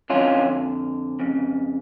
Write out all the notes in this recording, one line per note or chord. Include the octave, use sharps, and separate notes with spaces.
F2 D3 C#4 F4
F2 C#3